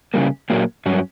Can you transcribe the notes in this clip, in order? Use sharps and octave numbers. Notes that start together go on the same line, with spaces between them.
C#3 G3 A#3
A#2 F#3 A#3
G2 F#3 C#4